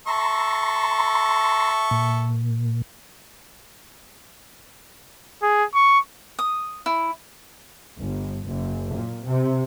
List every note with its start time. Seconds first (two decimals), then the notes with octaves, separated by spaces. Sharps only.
0.07 A4 E5 A#5 C6 C#6
1.91 A#2
5.43 G#4
5.74 C#6
6.39 D#6
6.86 E4
7.99 G1
8.47 F#1
8.96 A#2
9.26 C3